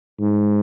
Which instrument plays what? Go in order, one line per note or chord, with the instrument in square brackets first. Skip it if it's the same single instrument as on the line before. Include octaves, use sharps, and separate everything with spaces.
[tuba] G#2